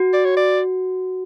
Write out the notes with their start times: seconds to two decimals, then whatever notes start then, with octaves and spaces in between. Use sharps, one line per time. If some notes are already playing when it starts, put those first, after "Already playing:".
Already playing: F#4
0.14 D5
0.25 C#5
0.37 D5